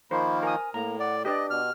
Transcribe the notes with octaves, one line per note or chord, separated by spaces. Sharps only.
D#3 F3 A#3 C5 B5
A#4 G#5 D#6
A2 A#3 A#5
D5 F#5
D4 G4 B4 D5 D#5
B2 F6